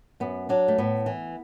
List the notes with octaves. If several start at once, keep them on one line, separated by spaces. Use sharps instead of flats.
F#2 B3
F#3 D4
A3
A2 B3
E3